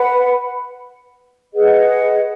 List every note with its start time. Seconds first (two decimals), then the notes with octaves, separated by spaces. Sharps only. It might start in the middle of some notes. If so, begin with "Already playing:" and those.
Already playing: B4 F#5 B5
1.54 G#4 B4 D#5 F#5